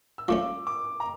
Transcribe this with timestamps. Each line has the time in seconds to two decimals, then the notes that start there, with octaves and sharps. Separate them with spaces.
0.18 E6
0.28 F3 A3 C#4 D6
0.67 D6
1.00 A#5